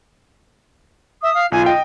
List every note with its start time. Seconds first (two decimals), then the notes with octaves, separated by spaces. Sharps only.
1.23 E5 D#6
1.34 F5
1.52 B1 F4 G#5
1.66 D#5 G5